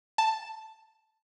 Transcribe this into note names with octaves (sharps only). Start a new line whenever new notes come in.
A5